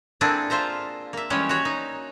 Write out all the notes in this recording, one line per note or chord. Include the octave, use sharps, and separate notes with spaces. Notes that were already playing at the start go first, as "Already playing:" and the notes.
A#3 C4 D4 E4 G#4 A4
F4 C5 E5 A#5
A#3 E5
E3 G3 G#3 C#4 C#5
F#4 C#5
D#4